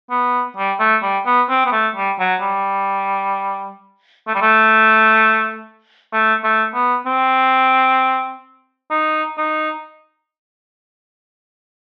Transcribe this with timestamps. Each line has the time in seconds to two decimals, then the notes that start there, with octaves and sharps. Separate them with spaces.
0.11 B3
0.57 G3
0.80 A3
1.03 G3
1.26 B3
1.49 C4
1.66 B3
1.73 A3
1.96 G3
2.20 F#3
2.42 G3
4.28 A3
4.35 G3
4.42 A3
6.13 A3
6.44 A3
6.75 B3
7.06 C4
8.91 D#4
9.38 D#4